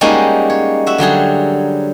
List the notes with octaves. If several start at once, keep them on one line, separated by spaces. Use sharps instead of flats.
G3 G#3 A#3 C#4 D#4 F#4
C#5
F#4 E5
D3 F#3 G3 G#4